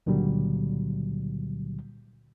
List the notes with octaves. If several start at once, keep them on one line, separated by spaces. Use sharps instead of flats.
C#2 A#2 D3 F#3 G3